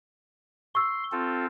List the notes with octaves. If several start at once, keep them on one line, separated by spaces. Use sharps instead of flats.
C6 C#6 E6
C4 F4 A4